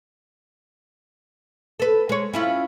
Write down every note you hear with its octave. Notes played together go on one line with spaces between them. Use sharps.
A4 B4
G#3 C#5
C#4 E4 F4